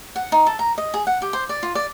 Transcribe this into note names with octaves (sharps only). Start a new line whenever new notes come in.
F#5
D#4
A4
A#5
D#5
G#4
F#5
G4
C5
D5
F4
D5